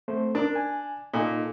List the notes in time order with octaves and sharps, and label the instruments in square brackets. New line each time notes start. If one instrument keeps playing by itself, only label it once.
[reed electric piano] A3 C4 C5
[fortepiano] D4 [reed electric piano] A#4
[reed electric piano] G#5
[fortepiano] A#2 [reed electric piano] D#4 A4